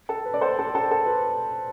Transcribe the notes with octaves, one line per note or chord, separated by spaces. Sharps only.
A4
B4
D5
A4 C5
A4
A4
A4
B4